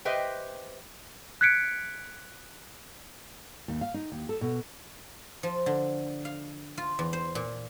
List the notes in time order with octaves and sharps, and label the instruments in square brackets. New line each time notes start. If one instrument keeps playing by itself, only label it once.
[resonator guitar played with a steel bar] G4 B4 C5 D#5 E5 G5
[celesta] F#6 G#6 B6 C#7 D7
[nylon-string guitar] D#2
F5
D#4
D#2
A4
B2
[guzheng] F3
D3
F5
F4
E2
C5
A#2